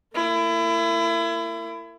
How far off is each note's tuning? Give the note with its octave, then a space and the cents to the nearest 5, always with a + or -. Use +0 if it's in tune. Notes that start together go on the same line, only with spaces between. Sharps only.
A#3 -40 E4 +30